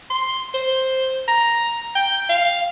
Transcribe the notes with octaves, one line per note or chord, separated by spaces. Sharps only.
C6
C5
A#5
G5
F5